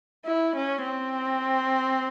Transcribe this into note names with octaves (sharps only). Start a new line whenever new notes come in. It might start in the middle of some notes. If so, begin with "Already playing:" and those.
E4
C#4
C4